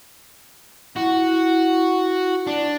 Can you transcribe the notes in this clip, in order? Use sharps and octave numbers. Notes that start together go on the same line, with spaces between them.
E4 F#4
D4 D5